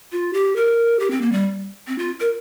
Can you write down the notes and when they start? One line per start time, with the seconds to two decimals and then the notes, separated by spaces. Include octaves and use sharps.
0.12 F4
0.33 G4
0.56 A#4
1.00 G4
1.11 C4
1.21 A#3
1.32 G3
1.88 C4
1.98 F4
2.20 A#4